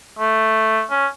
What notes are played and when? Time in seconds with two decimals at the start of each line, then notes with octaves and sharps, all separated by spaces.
0.19 A3
0.90 C#4